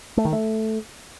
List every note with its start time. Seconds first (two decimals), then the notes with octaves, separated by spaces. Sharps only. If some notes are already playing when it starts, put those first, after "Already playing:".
0.17 A3
0.25 D#3
0.33 A3